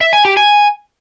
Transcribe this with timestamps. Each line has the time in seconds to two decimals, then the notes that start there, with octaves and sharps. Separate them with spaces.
0.01 E5
0.13 G#5
0.25 G4
0.37 G#5